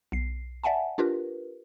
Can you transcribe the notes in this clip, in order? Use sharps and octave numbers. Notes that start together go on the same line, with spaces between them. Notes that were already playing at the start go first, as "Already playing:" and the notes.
B1 C7
D5 E5 F#5 G#5 A5
D4 F4 G4 A#4 B4